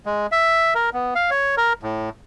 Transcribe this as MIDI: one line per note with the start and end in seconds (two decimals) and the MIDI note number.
0.06 0.27 56
0.32 0.74 76
0.75 0.90 70
0.94 1.14 59
1.15 1.30 77
1.31 1.55 73
1.57 1.73 70
1.83 2.09 45